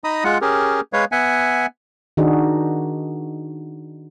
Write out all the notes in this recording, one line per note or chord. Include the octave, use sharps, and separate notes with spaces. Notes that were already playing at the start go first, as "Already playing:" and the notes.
D#4 D#5 A#5 B5 D#6
G#3 F4 F#5
C#4 G4 G#4 A#4
G#3 B4 C#5 F5
B3 E5 F#5 G#5
D#3 D4 D#4 F#4 G#4